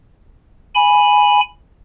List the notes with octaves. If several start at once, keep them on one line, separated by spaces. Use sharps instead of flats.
G#5 B5